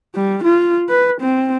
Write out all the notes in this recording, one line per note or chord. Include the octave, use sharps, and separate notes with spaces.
G3
F4
B4
C4